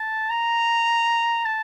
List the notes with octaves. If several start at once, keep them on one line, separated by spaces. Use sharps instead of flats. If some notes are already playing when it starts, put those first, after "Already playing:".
Already playing: A5
A#5
A5